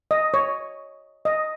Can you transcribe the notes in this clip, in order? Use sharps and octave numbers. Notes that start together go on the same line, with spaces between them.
D#5
C#5
D#5